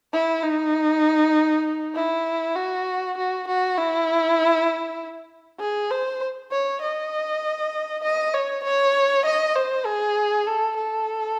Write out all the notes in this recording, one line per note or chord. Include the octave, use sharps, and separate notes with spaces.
E4
D#4
E4
F#4
F#4
F#4
E4
G#4
C5
C#5
D#5
D#5
C#5
C#5
D#5
C5
G#4
A4
A4